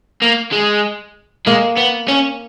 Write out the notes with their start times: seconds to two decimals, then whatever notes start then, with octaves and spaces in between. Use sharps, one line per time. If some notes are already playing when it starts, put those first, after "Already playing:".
0.22 A#3
0.53 G#3
1.47 G#3 A#3
1.78 B3
2.08 C#4